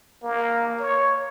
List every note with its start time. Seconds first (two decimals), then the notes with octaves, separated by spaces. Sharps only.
0.23 A#3
0.80 C#5